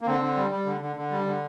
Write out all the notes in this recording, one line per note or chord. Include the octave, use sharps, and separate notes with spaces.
A#3
D3 C4
D3
G3
G3
D3
D3
D3
G3
D3